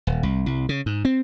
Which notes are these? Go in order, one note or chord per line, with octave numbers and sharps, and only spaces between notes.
D#1
C2
C2
C#3
G#2
C4